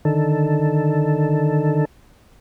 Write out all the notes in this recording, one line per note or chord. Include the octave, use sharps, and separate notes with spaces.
D3 D#3 A4